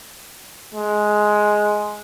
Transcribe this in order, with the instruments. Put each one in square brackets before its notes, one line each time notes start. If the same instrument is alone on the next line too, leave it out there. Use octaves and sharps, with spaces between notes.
[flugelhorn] G#3